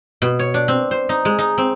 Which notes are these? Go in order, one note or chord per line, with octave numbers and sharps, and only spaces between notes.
B2
C#5
D4
C4
C5
D#4
G#3
D#4
C4